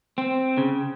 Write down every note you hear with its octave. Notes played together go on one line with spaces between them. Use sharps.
C4
C#3